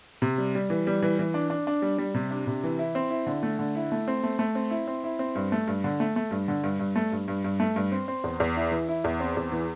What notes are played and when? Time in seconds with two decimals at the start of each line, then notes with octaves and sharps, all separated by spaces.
0.22 C3
0.38 G3
0.55 G3
0.70 E3
0.87 G3
1.03 E3
1.19 E3
1.34 D4
1.50 D4
1.67 D4
1.82 G3
1.98 G3
2.14 C3
2.31 D4
2.47 C3
2.63 E3
2.79 E4
2.95 C4
3.10 E4
3.26 D3
3.43 A3
3.59 D3
3.76 E4
3.92 A3
4.08 C4
4.23 A3
4.39 A3
4.55 C4
4.71 E4
4.88 C4
5.04 E4
5.19 C4
5.35 G2
5.52 A3
5.67 G2
5.84 D3
6.00 A3
6.16 A3
6.31 G2
6.48 D3
6.64 G2
6.79 G2
6.96 A3
7.12 G2
7.28 G2
7.44 G2
7.60 A3
7.76 G2
7.92 C4
8.08 C4
8.24 E2
8.40 E2
8.57 E4
8.72 E3
8.89 E4
9.04 E2
9.20 C4
9.37 E2
9.52 E3